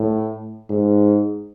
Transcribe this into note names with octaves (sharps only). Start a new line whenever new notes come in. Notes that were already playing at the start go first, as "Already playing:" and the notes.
Already playing: A2
G#2